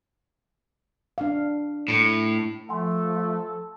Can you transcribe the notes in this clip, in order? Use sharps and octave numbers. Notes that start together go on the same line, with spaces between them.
D4 F5
A2
F3 A3 A4 F#5 G#5 C6